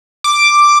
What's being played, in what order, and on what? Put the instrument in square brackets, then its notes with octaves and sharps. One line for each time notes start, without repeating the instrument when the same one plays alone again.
[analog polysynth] D6